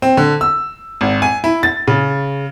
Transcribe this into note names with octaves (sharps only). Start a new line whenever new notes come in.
C4
D3
E6
G#1
G#5
E4
A6
C#3